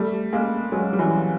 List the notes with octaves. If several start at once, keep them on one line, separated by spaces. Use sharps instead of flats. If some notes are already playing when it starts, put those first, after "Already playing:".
Already playing: G3 A3
G#3 A#3
F#3 G#3
G3
E3 F#3